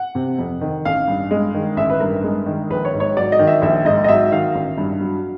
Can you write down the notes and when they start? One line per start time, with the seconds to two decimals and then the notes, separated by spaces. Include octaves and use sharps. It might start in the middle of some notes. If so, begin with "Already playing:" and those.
Already playing: F#5
0.15 C3
0.38 F2
0.61 D#3
0.85 A1 F5
1.08 G2
1.31 G#3
1.54 D#3
1.77 A1 E5
1.90 B4
2.00 G2 A#4
2.24 G#3
2.46 D#3
2.70 A#1 B4
2.85 C#5
2.94 G#2
3.00 C#5
3.17 F#3 D5
3.32 D#5
3.39 D#3
3.47 E5
3.62 A#1 E5
3.85 G#2 D#5
4.04 D#5
4.08 F#3 E5
4.31 D#3 F5
4.55 A1
4.78 G2
5.01 F#3